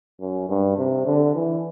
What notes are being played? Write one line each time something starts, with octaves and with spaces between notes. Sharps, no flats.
F#2
G2
C3
D3
E3